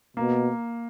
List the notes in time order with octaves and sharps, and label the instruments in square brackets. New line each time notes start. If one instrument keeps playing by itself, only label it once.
[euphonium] B2 [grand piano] A#3